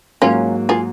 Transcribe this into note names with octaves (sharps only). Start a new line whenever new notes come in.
G#2 F#3 A#3 C#4 F4
F4 G#4